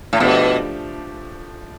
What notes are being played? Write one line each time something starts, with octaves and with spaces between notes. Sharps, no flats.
A2
B2 F3 A3 D4 G4